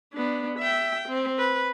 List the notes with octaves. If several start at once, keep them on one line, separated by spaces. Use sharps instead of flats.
B3 D4
E5 G5
C4
B4